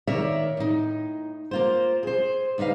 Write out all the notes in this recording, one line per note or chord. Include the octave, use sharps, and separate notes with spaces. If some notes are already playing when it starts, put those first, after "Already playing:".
D#3 A#3 A#4 C#5 D5 E5
A2 D#4
A#3 F4 C5
G#4 C5
D2 D4 D#4 B4 F5